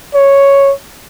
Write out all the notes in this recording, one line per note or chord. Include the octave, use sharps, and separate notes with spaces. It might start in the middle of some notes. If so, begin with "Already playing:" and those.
C#5